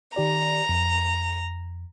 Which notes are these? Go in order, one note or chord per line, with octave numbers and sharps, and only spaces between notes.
D#3 G4 D5 A#5
F2